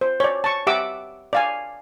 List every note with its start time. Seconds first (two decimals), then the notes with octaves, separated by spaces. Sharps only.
0.01 C5
0.20 C#5 D5
0.44 A5 C#6
0.67 G4 E5 F#5 D6 E6
1.33 D5 F5 G#5